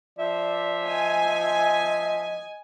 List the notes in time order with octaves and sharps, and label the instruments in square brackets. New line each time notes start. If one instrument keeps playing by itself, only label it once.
[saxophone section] F3 E5 [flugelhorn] D5
[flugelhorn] D#5 [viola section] G#5